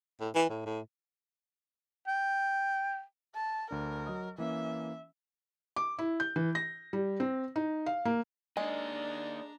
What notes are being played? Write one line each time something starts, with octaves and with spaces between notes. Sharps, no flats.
A2
E3
A2
A2
G5
A5
D2 D4 A#4
F#3 D#5 D#6
E3 A#3 C#4 E5
D6
E4
G6
E3
A#6
G3
C4
D#4
F5
A#3
G#3 A#3 D4 D#4 D5 A#5